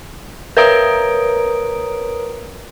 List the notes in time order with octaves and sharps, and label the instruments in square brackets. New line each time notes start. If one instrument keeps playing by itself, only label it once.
[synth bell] A#4 B4 C#5 A#5 D#6 D7